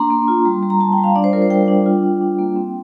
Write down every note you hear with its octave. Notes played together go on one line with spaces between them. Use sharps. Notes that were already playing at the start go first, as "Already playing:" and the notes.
Already playing: A#3 D4 A#5 C6
A#3
F4
G3
G3
A#5
G3 A5
G5
G3
F5
D4 D5
C5
F4 A#4
C5
G3 G5
D4
F4
D4
D4
A#3
C4